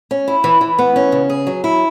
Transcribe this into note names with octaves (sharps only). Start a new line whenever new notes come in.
C#4
E4
E3
E3
B3
C#4
C#3
G#4
F#3
E4